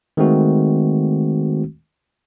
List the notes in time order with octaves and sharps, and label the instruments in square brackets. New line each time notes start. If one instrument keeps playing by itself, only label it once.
[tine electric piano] D#3 G#3 A3 C4 F#4